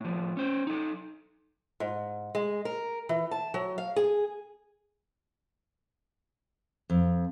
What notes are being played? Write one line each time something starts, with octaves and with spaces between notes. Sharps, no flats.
A2 F3
C#4 C5
D#4 A4
G#2
G#3
A#4
E3
A5
F#3
F5
G#4
F2